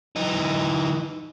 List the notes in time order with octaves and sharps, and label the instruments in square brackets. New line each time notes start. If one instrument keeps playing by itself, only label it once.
[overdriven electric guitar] E3 D#4